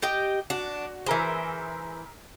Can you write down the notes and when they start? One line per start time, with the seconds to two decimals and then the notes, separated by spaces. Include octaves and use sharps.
0.02 G4 D#5 G5
0.50 D4 F#4
1.06 E3 G#4 A#4 C5 E5